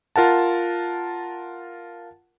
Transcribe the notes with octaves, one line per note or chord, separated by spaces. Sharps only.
F4 A#4 F#5 A5